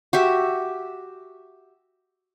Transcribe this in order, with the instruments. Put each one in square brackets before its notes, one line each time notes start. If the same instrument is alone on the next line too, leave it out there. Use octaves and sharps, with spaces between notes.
[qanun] F#4 G4 E5